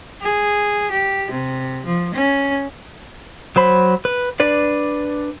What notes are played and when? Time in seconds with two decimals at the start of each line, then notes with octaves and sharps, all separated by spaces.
0.21 G#4
0.91 G4
1.31 C3
1.86 F3
2.14 C#4
3.56 F#3 C5 B5
4.05 B4
4.40 D4 B4 D5